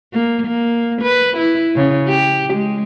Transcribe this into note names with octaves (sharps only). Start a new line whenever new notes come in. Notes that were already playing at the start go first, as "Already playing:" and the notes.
A#3
A#3
B4
E4
C#3
G4
G#3